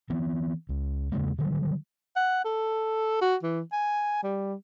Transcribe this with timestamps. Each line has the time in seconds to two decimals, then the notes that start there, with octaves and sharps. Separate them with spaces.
0.10 E3 B3 C4
0.69 C#2
1.12 E2 C#3 G#3 A#3
1.38 D3 D#3 F#3 G3
2.16 F#5
2.44 A4
3.21 F#4
3.43 E3
3.72 G#5
4.23 G3